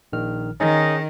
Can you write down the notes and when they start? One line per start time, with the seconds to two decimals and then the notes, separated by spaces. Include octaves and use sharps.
0.13 A#1 D#3 F6
0.60 D#3 C#4 D#4 G#4